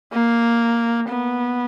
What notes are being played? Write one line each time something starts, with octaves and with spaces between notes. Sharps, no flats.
A#3
B3